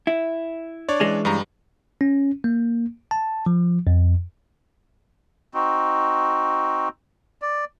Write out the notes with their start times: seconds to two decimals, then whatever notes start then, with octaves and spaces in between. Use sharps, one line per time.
0.07 E4
0.88 D4 C#5 D5
1.00 E3 G#3 C#4
1.25 G2 G3 A#5
2.01 C#4
2.44 A#3
3.11 A5
3.46 F3
3.87 F2
5.54 C4 D#4 F#4
7.42 D5